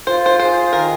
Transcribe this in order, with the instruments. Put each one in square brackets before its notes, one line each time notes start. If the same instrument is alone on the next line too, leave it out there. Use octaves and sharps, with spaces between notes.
[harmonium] F4 [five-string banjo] C5
[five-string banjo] C5
[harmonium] G#4 [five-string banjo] C5
[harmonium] D#3 [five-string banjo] A#4